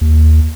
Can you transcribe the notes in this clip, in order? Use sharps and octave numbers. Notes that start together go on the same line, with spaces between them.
D#2